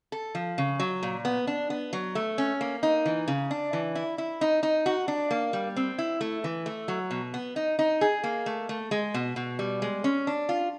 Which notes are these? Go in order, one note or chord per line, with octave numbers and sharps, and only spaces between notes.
A4
F3
C#3
F#3
A#2
B3
D4
B3
F#3
A3
C#4
A#3
D#4
E3
C#3
D4
E3
E4
E4
D#4
D#4
F#4
D4
A#3
G3
C4
E4
A3
E3
A3
F#3
B2
B3
D#4
D#4
G#4
A#3
A3
A3
G#3
B2
B2
G3
G#3
C#4
D4
F4